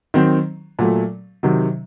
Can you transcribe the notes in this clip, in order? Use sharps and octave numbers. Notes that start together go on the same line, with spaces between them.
D#3 F#3 C4
A#2 F#3 A3
C3 D#3 F#3